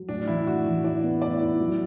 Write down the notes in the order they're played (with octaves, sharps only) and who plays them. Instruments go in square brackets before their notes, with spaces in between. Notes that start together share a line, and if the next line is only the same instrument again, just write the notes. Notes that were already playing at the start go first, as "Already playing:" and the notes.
Already playing: [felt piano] F#3
[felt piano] A2 [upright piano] D4
[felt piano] E3 [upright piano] E4
[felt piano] A2 [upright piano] F#4
[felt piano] E3 [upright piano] F#4
[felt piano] E4 [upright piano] D5
[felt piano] B3
[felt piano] E4 [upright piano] D5
[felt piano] E4
F#3